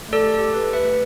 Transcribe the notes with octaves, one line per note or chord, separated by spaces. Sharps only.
A3 A4 D5
G4
A4
G4
G4 B4
A3 B4 E5
A3